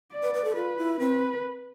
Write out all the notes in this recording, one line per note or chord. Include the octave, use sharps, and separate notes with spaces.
D5
B4
B4
A4
F4 B4
E4
C4 B4